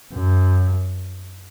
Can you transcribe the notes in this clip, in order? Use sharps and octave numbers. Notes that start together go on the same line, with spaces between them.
F#2